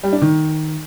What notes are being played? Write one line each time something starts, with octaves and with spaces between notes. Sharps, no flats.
G3
D4
D#3